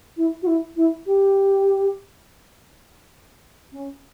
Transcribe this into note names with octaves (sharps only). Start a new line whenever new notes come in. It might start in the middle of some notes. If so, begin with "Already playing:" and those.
E4
F#4
E4
E4
G4
C#4